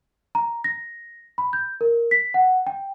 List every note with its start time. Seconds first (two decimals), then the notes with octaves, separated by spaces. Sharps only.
0.35 A#5
0.64 A#6
1.38 B5
1.53 G6
1.81 A#4
2.11 B6
2.34 F#5
2.67 G5